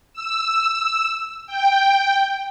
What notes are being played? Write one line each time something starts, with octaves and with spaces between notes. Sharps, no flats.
E6
G5